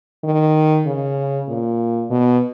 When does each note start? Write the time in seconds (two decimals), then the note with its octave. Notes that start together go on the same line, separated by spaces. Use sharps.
0.24 D#3
0.86 C#3
1.48 A#2
2.10 B2